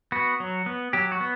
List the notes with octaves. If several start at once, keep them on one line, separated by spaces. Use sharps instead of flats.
B3 F#4
F#3
B3
F#3 G4
F#4
B3